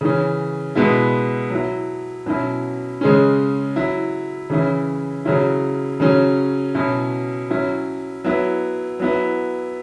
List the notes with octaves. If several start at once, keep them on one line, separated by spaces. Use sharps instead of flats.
C#3 E3 C#4
B2 G#3 B3 E4
F#3 E4
B2 F#3 C#4 E4
C#3 G#3 C#4
F#3 E4
C#3 E3 C#4 E4
C#3 F#3 C#4 E4
C#3 F#3 C#4
B2 F#3 C#4 E4
F#3 C#4 E4
F#3 B3 E4
F#3 B3 E4